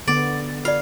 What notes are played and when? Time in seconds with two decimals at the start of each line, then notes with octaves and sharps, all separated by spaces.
0.08 D3 B3 D5
0.65 F4 D5 F5